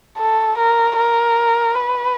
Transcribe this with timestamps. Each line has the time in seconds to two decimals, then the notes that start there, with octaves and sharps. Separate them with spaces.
0.18 A4
0.58 A#4
0.96 A#4
1.75 B4